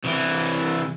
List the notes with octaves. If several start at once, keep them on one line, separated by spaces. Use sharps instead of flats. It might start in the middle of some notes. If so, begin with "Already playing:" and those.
C2 E3